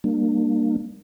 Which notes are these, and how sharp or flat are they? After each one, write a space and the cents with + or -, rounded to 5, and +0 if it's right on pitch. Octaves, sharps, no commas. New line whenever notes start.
G3 +20 A#3 +0 D4 +35